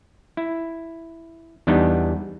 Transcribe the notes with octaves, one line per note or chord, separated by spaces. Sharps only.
E4
E2 G3 B3 D4 D#4